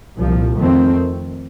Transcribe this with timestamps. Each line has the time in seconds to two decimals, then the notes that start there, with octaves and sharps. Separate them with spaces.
0.18 C2 A#2 F3
0.58 F2 D#3 A3 C4